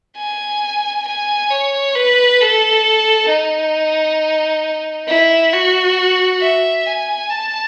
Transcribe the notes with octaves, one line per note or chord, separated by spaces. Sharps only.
G#5
G#5
C#5
B4
A4
D#4
E4
F#4
E5
G#5
A5